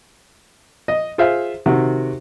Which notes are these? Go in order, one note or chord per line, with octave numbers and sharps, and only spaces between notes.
D#5
F4 G#4 C5 E5 F5
C3 D#3 F#4